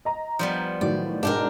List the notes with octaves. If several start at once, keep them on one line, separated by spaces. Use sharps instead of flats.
D#5 A#5
F3 G3 B3
A2 D#3 F#3 D5
G#2 B2 D4 G4 A#4